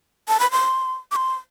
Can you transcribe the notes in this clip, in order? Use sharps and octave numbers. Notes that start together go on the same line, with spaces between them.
A5
B5
C6
D6
C6